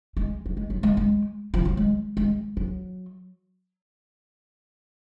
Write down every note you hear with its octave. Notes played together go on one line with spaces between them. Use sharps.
G#3
F#3
G#3
F#3
G#3
G#3
F3
F#3
G#3
G#3
F#3